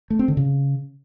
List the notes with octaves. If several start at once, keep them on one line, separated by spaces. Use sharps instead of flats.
A3
C4
D3
C#3